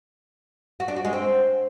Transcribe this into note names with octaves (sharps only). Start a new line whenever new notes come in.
F#4
D4
F#4
G#3
C4